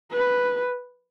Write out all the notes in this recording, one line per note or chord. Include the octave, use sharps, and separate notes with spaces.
B4